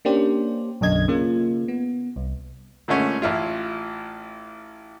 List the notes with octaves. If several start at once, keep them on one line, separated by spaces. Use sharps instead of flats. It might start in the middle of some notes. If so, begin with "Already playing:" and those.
A#3 C#4 D4 G4 C5
B1 F#2 D3 D#5 G#6
C#3 A#3 F4
B3
C2
A#2 D3 G#3 A3 C#4
A1 E4 F4